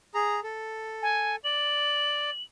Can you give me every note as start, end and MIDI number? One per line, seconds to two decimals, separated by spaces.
0.14 0.40 68
0.14 0.40 82
0.43 1.36 69
1.02 1.36 80
1.44 2.30 74
1.44 2.43 102